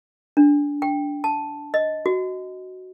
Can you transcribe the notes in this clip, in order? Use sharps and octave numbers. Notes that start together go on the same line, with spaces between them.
D4
G5
A5
D#5
F#4